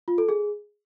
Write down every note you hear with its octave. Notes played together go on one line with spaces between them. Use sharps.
F4
A4
G#4